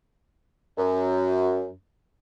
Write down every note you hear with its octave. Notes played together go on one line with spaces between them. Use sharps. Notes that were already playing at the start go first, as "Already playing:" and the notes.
F#2